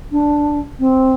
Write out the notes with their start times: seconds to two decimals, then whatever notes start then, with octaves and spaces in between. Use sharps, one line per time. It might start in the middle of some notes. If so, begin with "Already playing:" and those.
0.11 D4
0.79 C4